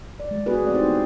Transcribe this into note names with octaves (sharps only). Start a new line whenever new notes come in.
D5
G#3
B3 F#4 G#4 B4
A3 C4 D5
C4 D#4 E4 F#4 G4 C5
B3